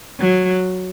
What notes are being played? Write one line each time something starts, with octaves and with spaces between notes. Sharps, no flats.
F#3